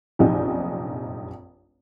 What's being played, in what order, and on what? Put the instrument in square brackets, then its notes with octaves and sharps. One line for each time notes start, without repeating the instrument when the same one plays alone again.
[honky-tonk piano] F1 A#1 F#2 D#4 G4 G#5